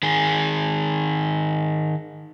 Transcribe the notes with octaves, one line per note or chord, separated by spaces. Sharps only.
D#3 G#4